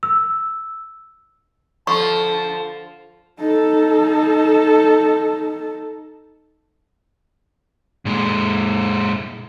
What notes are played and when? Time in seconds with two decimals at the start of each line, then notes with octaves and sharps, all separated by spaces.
0.03 E6
1.87 D3 F3 A5 C#6
3.39 D#4 A4
8.05 A#2 G#3